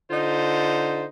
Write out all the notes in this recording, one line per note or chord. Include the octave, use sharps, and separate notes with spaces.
D3 D#4 F4 C5